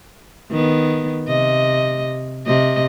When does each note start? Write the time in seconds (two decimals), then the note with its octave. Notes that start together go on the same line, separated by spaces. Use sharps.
0.50 D#3 B3
1.28 C3 D#5
2.46 C3 D#5